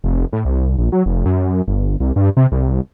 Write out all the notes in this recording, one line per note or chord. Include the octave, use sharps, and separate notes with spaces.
F1
A2
C2
A#1
F#3
F1
F#2
G1
C2
G2
C3
C2